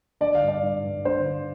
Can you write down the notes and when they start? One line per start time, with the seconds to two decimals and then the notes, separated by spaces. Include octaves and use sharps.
0.21 D3 D5
0.35 F5
0.42 G2
0.48 D5
0.63 G2
0.84 G2
1.05 D3 C5
1.26 D3